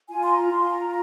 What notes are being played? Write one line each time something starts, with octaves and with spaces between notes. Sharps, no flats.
F4 G#5
C6
A#5
F4 C6
G#5
A#5